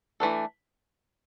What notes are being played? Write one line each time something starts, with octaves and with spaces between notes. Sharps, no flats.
E3 A3 D4 A4